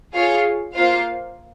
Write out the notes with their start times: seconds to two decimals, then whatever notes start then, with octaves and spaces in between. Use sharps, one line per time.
0.13 F4 G#4 C#5 F5
0.74 A#3 F4 C5 F5